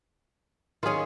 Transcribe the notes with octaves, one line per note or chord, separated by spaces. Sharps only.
D#3 C#4 F4 G#4